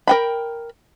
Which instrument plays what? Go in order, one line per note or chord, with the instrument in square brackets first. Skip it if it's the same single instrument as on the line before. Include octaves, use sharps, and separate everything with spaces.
[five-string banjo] A#4 G5 B5